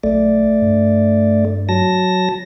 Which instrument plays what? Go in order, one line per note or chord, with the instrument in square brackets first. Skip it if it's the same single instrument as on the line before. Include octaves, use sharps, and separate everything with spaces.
[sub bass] B1 [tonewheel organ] A3 D5
[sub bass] G2
[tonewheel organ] F#3 A5 A#6